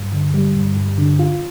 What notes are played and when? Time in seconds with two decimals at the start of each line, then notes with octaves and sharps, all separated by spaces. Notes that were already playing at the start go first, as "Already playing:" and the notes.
Already playing: G2
0.13 D3
0.34 G3
0.56 G2
0.77 G2
0.98 D3
1.19 F4